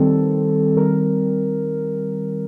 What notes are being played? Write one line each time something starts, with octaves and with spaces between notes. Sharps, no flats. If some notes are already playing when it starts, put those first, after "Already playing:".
Already playing: D#3 G3 C4 A4
D#3 G3 C4 A#4